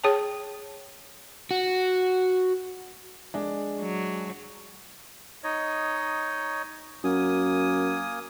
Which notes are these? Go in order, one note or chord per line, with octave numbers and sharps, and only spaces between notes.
G#4 C#5 G5 A5
F#4
G#3 D4
F#3
D#4 C#5 D#5
F#2 A#3 G#5 D#6